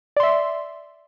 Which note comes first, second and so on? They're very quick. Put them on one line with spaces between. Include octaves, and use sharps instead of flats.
D5 C6 E5